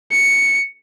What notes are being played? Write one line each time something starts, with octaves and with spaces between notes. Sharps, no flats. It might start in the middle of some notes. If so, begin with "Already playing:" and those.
C#7